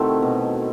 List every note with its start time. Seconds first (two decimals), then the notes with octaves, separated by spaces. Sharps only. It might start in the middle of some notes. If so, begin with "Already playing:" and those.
Already playing: C3 D#3 A3 C4 E4 F#4 A4
0.22 B2